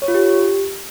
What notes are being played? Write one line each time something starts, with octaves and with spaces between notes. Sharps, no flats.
C#5
F4
G4